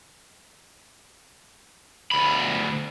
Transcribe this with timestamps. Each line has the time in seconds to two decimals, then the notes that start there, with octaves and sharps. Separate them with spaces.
2.12 D2 B5